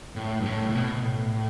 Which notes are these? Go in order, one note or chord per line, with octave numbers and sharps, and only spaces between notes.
A2
G2
A2
A2
B2
B2
A2